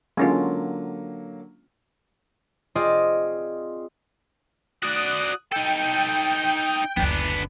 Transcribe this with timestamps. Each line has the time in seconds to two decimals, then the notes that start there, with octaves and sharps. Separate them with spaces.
0.17 D3 F#3 G#3 A#3 C#4 F4
2.75 C4 F4 G#4 D5 D#5
4.83 F#4 D5 D#6 F#6
5.52 D#4 A4 G5
6.97 F#1 D2 B3 D4